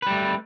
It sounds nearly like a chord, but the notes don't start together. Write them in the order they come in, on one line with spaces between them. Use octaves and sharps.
B4 G3 A3